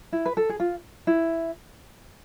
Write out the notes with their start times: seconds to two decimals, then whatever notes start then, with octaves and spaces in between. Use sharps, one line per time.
0.13 E4
0.26 B4
0.37 A4
0.49 G#4
0.60 F4
1.07 E4